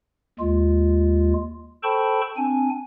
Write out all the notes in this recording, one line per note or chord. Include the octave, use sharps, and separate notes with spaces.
D#2 G#3 F4
A4 C5 G5 A5 B5 C#6
C4 D4 G#5